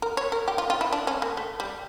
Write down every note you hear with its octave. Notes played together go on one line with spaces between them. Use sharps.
A#4
C#5
A#4
G4
F4
F4
E4
D4
C#4
A#3
A3
G3